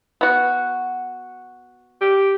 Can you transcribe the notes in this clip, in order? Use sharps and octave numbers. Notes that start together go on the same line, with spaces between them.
B3 F#4
G4